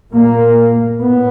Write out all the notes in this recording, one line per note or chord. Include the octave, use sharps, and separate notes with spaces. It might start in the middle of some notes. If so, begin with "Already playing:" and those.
A#2 A#3
A2 B3